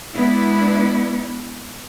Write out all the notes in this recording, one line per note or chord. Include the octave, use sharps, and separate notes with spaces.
G#3 B3 D4 E4